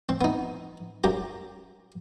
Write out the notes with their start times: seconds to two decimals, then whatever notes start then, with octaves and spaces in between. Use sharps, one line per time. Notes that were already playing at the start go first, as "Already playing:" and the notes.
0.09 C4
0.21 B3 D#4
1.04 F#2 G4 A#5